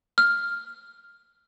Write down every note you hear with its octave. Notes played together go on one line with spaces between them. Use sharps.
F6